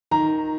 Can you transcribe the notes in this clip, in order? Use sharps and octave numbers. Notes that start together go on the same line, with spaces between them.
D#3 A#5